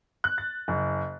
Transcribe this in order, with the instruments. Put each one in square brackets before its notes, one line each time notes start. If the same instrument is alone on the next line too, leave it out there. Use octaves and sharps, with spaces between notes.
[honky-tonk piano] F#6
A6
F#1